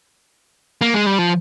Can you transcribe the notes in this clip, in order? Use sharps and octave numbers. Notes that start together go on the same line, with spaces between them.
A#3
G#3
G3
F3